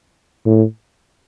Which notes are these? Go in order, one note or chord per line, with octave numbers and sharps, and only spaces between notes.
A2